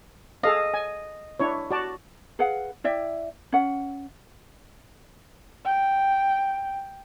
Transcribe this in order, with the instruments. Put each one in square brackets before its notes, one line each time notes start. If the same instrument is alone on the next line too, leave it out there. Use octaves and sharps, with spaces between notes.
[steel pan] G#4 A4 F5 [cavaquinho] D#5
[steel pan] G#5
D4 E4 C#5
F#4 D5 A5
[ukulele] G#4 B4 F5 F#5
E4 D5 E5 G5
C#4 F#5
[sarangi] G5